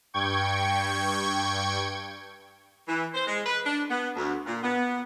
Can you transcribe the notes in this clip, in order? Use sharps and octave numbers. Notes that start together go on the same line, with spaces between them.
G2 G5 C#6 G#6
E3
C5
G#3
B4
D4
B3
D2
A#2
B3